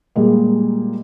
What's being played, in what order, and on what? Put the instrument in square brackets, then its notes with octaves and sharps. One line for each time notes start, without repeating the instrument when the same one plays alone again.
[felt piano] A#2 G3 G#3 A#3